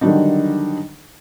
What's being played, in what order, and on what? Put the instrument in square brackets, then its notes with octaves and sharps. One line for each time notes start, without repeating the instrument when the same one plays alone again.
[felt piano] D3 D#3 F#3 G3 D4 D#4